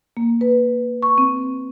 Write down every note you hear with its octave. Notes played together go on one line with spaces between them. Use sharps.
A#3
B4
C#6
C4